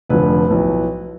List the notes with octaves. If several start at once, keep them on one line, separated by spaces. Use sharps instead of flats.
F1 F2 D3 F3 B4
B1 A2 F3